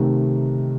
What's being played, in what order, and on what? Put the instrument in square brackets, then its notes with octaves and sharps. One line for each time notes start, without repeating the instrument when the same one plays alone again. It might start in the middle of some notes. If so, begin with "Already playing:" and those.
Already playing: [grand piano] C3 D#3 A3